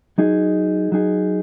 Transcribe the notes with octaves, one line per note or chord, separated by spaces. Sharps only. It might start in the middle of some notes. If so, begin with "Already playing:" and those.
F#3 D#4 G#4
F#3 D#4 G#4